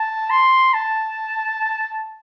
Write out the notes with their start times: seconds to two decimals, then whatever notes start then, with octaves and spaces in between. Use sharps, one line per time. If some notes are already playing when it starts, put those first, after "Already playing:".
Already playing: A5
0.30 C6
0.74 A5